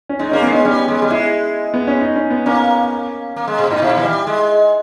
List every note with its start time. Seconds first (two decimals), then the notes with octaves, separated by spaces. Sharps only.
0.09 C#4
0.19 G#3 D#4
0.32 A#3 C#4
0.42 G#3 B3
0.54 C#4
0.65 G3 C#4
0.88 G#3
1.02 G3
1.10 G#3 E4
1.74 B3
1.87 C#4
2.01 D#4
2.16 C#4
2.30 B3
2.46 A#3 C#4
3.36 A#3
3.48 G#3
3.59 A#2
3.70 G#2 D#4
3.82 A#2 E4
3.96 E3
4.04 G3
4.27 G#3